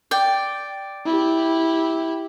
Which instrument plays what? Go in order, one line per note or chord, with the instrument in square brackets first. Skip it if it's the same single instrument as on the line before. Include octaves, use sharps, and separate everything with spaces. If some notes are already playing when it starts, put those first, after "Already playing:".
[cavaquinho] D5 G5
[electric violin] E4 G4